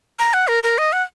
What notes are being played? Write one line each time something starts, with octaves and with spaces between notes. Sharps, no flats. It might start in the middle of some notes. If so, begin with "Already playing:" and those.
A#5
F#5
A#4
A#4
D#5
F#5